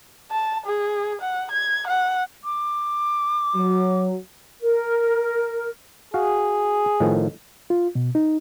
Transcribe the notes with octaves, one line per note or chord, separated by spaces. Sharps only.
A5
G#4
F#5
G#6
F#5
D6
F#3
A#4
F#4 G#4 F5
A2 D#3 F3
F4
B2
D#4